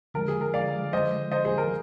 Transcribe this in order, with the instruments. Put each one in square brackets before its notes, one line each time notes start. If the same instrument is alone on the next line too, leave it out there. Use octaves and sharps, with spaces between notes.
[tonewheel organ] D3 F3 G#3 [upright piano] A#4
[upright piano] G#4
A#4
D5 F5
C5 D#5
C5 D#5
G#4 C5
A#4